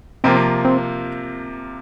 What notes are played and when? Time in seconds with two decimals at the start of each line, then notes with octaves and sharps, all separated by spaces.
0.24 C3 F3 A#3 C4 F4
0.65 C4